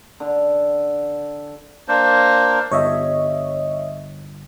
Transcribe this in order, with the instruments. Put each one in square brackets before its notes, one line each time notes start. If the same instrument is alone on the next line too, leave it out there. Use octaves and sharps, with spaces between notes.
[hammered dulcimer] D3
[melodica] A#3 D4 C5
[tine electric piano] G1 [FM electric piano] C#5 D#5 E5